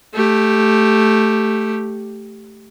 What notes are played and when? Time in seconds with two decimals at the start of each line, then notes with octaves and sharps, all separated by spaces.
0.14 A3 G4